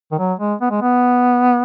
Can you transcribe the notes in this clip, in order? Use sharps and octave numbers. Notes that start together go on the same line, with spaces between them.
D#3
F#3
G#3
B3
G#3
B3